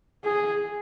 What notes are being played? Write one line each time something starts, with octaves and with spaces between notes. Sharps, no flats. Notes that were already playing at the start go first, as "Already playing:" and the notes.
G#4